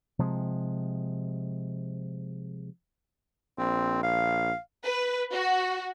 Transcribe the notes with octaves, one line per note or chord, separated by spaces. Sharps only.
C3 F3 G#3
A#1 C4
F5
B4
F#4